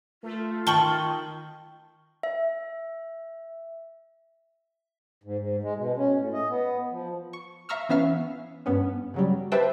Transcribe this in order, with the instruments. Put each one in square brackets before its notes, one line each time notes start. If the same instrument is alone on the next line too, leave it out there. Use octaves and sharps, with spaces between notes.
[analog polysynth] A3 [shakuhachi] F4
[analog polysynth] D#3 [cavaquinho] G5 C#6 [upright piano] A5 F#7 G7
[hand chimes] E5
[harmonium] G#2
G#2
G#3
B2
C#4
A2
D#5
B3
F3
[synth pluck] C#6
E5 F5 A#5 C#6 E6 F6
E3 B3 C#4 E5 F5 F6
G2 B3 C#4
C#3 F#3 G3
G4 B4 C5 E5 G5 A5